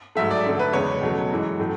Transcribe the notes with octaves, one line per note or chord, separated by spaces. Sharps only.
G#2 F#3 A3 E5
D5
F#2 D3 F#3 A3
B4
E2 C#3 G#3 C#5
B2 F#3 A3
F#2 E3 G#3
A2 F#3 A3